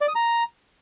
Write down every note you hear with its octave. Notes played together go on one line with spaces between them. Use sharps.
D5
D#6
A#5